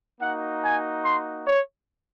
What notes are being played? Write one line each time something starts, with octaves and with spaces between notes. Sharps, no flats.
A#3 D#4 F#4 F#5
G#5
C6
C#5